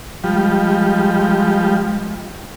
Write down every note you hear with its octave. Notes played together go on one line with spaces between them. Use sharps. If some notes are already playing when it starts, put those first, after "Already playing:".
F3 G3 G#3